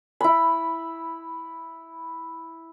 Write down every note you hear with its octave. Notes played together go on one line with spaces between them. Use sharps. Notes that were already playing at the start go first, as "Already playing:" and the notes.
E4 B5